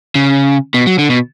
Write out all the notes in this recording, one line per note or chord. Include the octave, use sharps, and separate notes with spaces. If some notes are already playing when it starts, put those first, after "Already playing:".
C#3
B2
F#3
D3
B2